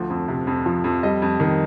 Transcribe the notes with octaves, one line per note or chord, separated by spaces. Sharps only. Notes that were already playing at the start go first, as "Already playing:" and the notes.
Already playing: D2 F3
F2
C3
F2
F3
F2
G3 D#5
F2
D#3